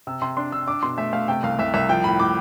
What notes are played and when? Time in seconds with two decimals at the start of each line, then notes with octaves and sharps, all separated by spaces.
0.07 C3 E6
0.22 C3 C6
0.37 D4 C6
0.52 D4 E6
0.67 D4 D6
0.83 B2 C6
0.98 A3 E5
1.13 A3 F5
1.28 C3 G5
1.43 C2 F5
1.59 C2 E5
1.74 C2 E5
1.89 F3 G5
2.04 A2 B5
2.19 A2 D6